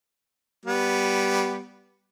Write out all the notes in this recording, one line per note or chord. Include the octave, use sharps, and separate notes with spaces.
G3 B3